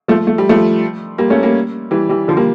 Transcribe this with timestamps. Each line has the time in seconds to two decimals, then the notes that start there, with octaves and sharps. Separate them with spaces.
0.08 F3 A3
0.27 A3
0.38 G3
0.49 F3 A3
1.18 G3 A#3
1.30 A3 C#4
1.43 G3 A#3
1.91 E3 G3
2.09 E3 G3
2.28 D3 F3
2.37 G3 A#3